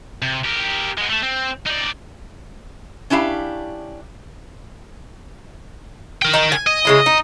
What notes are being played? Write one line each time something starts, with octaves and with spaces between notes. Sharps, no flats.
C3
G4 A#4
G#3 B3
A3 A4
C4
D#4 D5
C#4 D4 E4 G4 F5
A#4 G5
D#4
G#5
D#5
C#3 G#3 E4
D#4